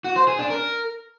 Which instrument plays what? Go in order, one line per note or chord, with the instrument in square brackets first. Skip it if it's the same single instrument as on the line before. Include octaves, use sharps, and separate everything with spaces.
[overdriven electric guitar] F#4
C5
G#4
D4
A#4